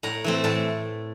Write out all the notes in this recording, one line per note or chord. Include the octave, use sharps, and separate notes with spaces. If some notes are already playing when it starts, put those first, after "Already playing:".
A2 A#5
E3 A3 C4
A2 A5